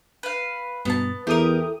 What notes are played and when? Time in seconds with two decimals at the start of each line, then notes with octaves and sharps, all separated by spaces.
0.23 B4 F5
0.85 G2 B2 B3 A5
1.27 E2 E4 G4 A4 A#4 D#6